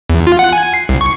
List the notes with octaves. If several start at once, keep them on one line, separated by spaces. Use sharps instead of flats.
E2
F4
F#5
G#5
C7
C2
C#6